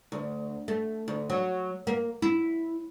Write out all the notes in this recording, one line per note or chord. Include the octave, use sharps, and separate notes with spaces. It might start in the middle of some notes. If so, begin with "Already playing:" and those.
D2
A3
D2
F#3
A#3
E4